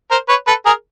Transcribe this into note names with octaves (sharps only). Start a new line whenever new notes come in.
A#4 C5
B4 C#5
A4 B4
G#4 A#4